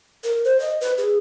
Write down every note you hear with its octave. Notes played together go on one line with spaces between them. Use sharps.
A#4
C5
D#5
B4
G#4